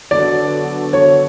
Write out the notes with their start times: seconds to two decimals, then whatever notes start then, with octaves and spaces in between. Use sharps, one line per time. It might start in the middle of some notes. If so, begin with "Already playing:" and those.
0.11 D3 F#3 B3 F#4 A4 D5
0.93 D3 F#3 B3 F#4 A4 C#5